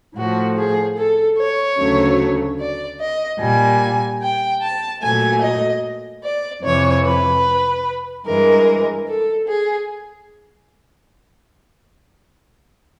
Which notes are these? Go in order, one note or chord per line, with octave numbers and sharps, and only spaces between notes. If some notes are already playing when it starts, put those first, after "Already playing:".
A2 F3 A3 F#4
G#4
A4
C#5
D2 C#3 F#3 A3
D5
D#5
A#2 G3 G#5
G5
A5
A#2 F#3 A3 G#5
D#5
D5
F2 C3 E3 C#5
B4
G2 E3 G#3 A#4
A4
G#4